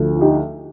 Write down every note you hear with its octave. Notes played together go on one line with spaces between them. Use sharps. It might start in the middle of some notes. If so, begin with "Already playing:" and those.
Already playing: D2 D3 F3
F4
D#4 G4